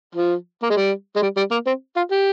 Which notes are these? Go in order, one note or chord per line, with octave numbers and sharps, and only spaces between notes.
F3
A#3
G#3
G3
G#3
G3
G3
A#3
C4
F4
G4